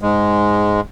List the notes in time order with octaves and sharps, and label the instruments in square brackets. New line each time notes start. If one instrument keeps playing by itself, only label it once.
[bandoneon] G#2 G#3